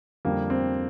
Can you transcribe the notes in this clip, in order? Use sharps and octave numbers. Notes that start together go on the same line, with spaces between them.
F2 D3 G3 A#3
C4